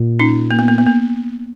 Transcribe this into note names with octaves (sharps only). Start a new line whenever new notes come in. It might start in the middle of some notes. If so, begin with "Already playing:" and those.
Already playing: A#2
C#4 D#4
A#3
B3
A#3
B3
A#3